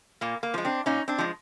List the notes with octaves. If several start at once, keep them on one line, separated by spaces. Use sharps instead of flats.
A#2 A#3
A#3
F3 G#3
C4 D4
A#2 C#4 D#4
C4 D4
F3 G#3